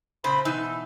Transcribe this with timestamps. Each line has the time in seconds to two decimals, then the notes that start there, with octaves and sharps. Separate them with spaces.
0.24 A#2 C#3 C5 B5
0.45 B2 E3 D#4 E6